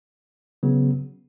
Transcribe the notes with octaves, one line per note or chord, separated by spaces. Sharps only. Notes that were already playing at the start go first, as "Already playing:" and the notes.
C#3 F#3 B3